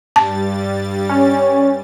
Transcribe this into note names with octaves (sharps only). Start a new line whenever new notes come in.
G2 G3 A5 A6
C#4